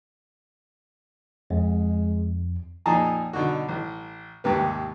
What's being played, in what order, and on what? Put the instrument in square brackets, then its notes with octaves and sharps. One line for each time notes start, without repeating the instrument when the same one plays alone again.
[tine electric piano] F2 [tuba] G#3
[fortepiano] F2 A#2 D#4 G#4 A5 A#5
B2 D3 D#4 F#4
A1
D#2 G#2 C3 B4